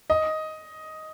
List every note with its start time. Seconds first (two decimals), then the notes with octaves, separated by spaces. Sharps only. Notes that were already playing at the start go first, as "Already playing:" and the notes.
0.10 D#5